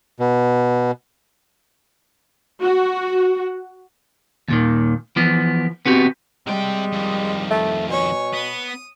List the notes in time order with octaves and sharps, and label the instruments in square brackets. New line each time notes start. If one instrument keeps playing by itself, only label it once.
[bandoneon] B2
[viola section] F#4
[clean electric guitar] D#2 A#2 D#3
E3 F3 B3
B3 C4 F#4 G4
[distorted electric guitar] C3 G5 [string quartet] G3 [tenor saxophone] G#3
[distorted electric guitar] F2 D#3
[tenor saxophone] A3
[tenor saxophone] B2 [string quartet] C#5 G#5
[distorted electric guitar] B3 [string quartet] D#6